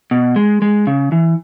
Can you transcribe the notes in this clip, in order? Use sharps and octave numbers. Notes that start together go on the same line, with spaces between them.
B2
G#3
G#3
C#3
E3